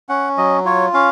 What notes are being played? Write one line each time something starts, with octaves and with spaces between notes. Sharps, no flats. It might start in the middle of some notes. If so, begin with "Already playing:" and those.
C#4 F#5
F#3 D#5
F4 C#5
C#4 F5